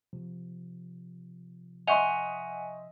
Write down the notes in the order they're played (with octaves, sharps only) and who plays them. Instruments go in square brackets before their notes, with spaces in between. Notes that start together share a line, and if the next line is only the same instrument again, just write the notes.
[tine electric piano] C3 F3
[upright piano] D#5 E5 G6 [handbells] F#5 G#5 [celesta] C6 C#6 F7